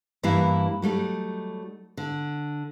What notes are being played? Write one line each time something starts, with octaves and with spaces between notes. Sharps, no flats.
G2 E3 G3 A#3 E4 F5
F#3 G3 A3 D#4
D3